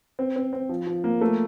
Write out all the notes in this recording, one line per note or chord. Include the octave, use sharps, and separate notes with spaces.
C4
C4
C4
F3
F3
A#3
A3